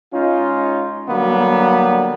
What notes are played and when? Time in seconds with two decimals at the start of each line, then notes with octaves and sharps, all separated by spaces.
0.14 G#3 C#4 D#4 F4
1.09 D3 F#3 G3 A#3 B3